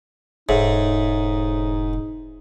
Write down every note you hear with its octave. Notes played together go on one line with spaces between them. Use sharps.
E1 G#2 D#4 A4 C#5 E5